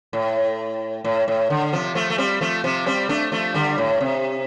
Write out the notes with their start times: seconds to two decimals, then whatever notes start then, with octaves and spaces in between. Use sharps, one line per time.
0.13 A2
1.04 A2
1.28 A2
1.50 D3
1.73 C3 F3
1.95 F3 A3
2.10 A3
2.18 G3 C4
2.41 F3 A3
2.64 C3 F3
2.86 G3 C4
3.09 A3 D4
3.32 F3 A3
3.54 D3 G3
3.78 A2
4.01 C3